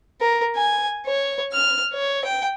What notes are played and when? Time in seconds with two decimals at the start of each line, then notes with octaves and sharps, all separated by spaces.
0.21 A#4
0.56 G#5
1.06 C#5
1.53 F6
1.93 C#5
2.25 G5